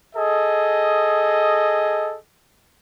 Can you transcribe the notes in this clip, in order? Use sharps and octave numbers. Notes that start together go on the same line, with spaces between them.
G#4 A4 D#5